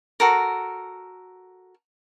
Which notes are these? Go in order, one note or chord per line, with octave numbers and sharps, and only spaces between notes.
F#4 A4 A#4